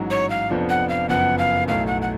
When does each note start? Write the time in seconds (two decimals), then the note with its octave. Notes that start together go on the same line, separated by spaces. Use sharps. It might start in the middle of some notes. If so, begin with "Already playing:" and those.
Already playing: A1 G#2 F#3
0.11 C#5
0.30 F5
0.50 F1 F2 F3 B3 D4
0.70 F#5
0.89 F5
1.09 F#1 F#2 F3 B3 F#5
1.38 F5
1.67 B1 A2 F#3 A3 F5
1.87 F#5
2.02 F#5